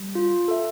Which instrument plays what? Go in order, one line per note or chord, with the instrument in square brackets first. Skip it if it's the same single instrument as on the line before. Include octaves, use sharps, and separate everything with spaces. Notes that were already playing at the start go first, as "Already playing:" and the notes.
Already playing: [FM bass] G3
[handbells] F4
A4 E5